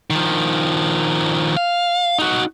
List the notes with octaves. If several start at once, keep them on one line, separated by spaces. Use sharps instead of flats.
D#3 F3
F5
D#4 F#4